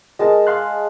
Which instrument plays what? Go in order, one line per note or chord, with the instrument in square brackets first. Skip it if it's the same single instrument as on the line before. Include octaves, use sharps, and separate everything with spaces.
[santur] G#3 A5 [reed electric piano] A#4 D#5
[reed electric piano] F5 C6 F#6